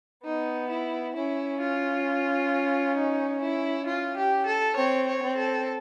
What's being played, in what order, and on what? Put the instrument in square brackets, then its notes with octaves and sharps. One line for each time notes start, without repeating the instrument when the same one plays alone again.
[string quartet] B3 [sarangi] D#4
[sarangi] E4
[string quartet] C#4 [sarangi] E4
[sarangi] F4
D#4
E4
F4
G4
A4
[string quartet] C4 [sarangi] C#5
[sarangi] C#5
[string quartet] C4
[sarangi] A4